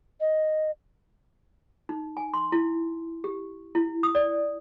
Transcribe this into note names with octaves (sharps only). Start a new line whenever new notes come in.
D#5
D#4
G#5
C6
E4
G4
E4
D#6
D5